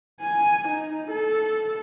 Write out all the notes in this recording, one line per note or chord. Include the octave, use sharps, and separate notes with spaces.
G#5
D#4
A4